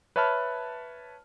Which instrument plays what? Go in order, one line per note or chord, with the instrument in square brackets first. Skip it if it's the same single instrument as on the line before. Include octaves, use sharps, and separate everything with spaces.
[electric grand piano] B4 C#5 E5 A5 B5 F6